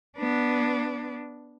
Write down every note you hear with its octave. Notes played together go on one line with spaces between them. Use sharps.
B3 D4